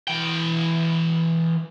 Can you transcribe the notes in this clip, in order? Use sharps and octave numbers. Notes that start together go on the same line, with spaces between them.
E3 G5